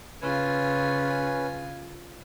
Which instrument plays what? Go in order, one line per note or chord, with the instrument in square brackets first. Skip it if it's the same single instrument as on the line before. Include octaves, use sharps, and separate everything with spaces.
[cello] C#3 [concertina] C#4 B4 [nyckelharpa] F4 G#5